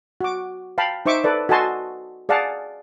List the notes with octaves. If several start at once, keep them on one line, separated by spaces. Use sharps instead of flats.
F#4 D6
F5 G5 A5 B5
D#4 C5 E5 C#6 D6
A4 B4 D5
F#4 A4 D#5 G#5 A5 C6
G#4 D5 F5 F#5 A5